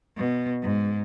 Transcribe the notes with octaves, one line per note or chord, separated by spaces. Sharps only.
B2
G#2